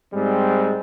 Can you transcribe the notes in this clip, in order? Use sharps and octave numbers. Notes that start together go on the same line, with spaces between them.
G#2 G3 G#3 C4